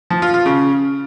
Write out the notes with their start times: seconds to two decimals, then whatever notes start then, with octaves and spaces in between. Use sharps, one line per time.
0.10 F3
0.22 F4
0.34 F4
0.46 C#3